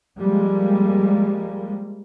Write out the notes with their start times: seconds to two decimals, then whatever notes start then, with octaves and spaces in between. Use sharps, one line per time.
0.19 F3 G3 G#3 A#3